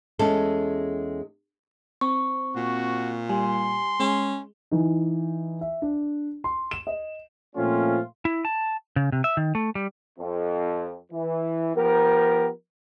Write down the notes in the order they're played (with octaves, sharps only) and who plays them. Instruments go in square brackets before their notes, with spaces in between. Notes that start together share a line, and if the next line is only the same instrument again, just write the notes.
[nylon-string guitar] E2 G#3 C#4 A4
[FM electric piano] C4 [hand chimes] C#6
[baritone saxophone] A#2 [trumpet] F#4
[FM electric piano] G3 [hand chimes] G#5 [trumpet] C6
[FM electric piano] G#3 [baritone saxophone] C#4
[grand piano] E3 D#4
E5
D4
C6
E7
D#5
[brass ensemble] A#2 F3 A3 C4 C#4 F4
[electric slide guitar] E4
A5
C#3
C3
E5
D#3
A3
G3
[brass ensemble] F2
E3
F3 B3 G4 A#4